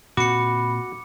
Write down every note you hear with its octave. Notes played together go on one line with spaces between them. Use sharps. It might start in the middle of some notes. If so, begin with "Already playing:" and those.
A#2 C4 F#4 B5 D6 C#7